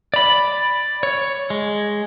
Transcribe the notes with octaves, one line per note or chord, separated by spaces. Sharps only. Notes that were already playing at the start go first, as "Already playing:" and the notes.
D5 B5
C#5
G#3